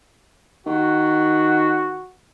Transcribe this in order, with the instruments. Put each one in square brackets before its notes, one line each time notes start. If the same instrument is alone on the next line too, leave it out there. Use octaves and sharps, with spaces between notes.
[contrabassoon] D#3 [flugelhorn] F#4